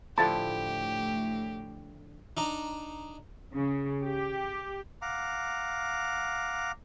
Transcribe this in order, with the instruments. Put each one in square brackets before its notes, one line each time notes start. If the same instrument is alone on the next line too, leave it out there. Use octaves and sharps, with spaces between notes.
[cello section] A2 [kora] D3 F3 E4 [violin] G4 [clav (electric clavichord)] A5
[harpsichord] D4 D#4 A#5
[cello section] C#3
G4
[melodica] F5 F#5 A#5 D6